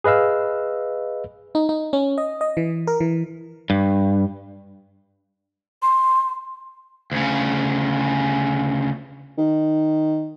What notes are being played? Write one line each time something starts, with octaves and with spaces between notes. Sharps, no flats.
G#4 B4 D#5 F5 E6
D#4
D#4
C#4
D#5
D#5
E3
A#4
E3
G2
C6
D2 C#3
D#3